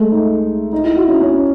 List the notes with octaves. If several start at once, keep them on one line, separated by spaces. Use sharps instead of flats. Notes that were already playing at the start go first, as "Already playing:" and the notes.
Already playing: G#3 A3
D#4
D#4
E4
F#4
C#4
C#4